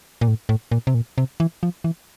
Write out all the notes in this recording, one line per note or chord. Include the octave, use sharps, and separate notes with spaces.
A#2
A2
A2
A#2
C3
A#2
C3
E3
F3
E3